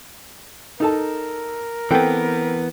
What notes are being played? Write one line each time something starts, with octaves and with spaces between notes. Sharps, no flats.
D#4 A4 A#4 A5
E3 B3 C4 A4 G5